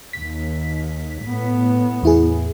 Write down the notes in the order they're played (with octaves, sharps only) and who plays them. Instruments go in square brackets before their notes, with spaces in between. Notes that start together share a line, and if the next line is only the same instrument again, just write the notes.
[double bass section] D#2 [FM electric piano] B6
[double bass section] A2 B3
[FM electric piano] E2 E4 G#4